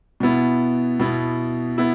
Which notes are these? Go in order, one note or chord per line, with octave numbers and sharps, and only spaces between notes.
B2 B3 E4
B2 B3 E4
B3 E4